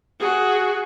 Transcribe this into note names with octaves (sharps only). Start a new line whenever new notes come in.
F#4 G#4